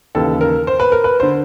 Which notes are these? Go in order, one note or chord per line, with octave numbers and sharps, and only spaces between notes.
D#2 C#3 E3 A4
A#4
C5
B4
A#4
B4
D3 C5